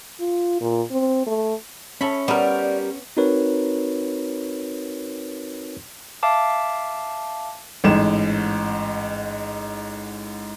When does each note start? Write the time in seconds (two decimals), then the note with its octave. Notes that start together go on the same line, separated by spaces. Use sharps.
0.20 F4
0.61 A#2
0.91 C4
1.26 A3
2.01 C#4 A4 E5 B5
2.28 G3 B3 A#4 D5
3.17 C4 D#4 F#4 A#4 B4 C#5
6.23 E5 F5 A5 D6
7.84 A1 G#2 E7